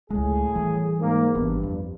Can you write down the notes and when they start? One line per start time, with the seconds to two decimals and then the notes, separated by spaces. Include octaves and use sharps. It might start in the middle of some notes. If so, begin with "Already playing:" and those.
0.10 C#2 A2 G#3 G#4
0.55 E3 G3
0.98 G#2 A#3
1.34 G#1 G2 E3 B3
1.63 F2